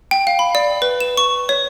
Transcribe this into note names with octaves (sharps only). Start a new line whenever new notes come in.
G5
F5
B5
D5
B4
E7
C#6
C#5